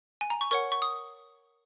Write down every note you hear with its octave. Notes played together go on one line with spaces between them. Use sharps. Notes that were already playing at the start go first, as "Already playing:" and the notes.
G#5
A#5
C#6
A#4 C#5 F#5 C#6
C#6
D#6